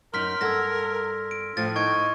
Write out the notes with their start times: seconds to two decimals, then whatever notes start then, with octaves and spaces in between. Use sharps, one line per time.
0.14 F#2 D#4 A#4 C6 F6 B6
0.41 G2 A4 F#5 E6 G#6 A#6
1.31 D7
1.57 A2 F3 A6
1.76 D#4 C#6 G#6 D7